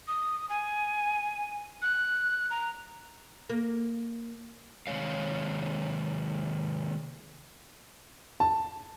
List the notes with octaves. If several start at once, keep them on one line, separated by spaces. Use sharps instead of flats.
D#6
G#5
F#6
A#5
A#3
C3 D#3 G#3 C#5 F5
A5